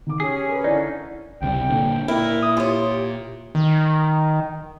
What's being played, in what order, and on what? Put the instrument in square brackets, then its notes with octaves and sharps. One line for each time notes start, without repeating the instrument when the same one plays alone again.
[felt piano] D#3 D6
[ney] C#4 [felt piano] G4 [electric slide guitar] G#4
[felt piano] A#4 B4
[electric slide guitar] D3 D#4 [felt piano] E4 G#5 [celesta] D5
[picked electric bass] C#2 C3 G3 [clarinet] G5
[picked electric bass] A#2 D3
[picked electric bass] A#2 [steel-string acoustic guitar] E4 [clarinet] A#4
[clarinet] D#6
[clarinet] F4 [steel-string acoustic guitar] G4 C#5
[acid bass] D#3